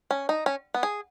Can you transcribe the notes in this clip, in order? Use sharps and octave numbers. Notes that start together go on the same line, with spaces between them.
C#4
D#4
C#4
B3
G#4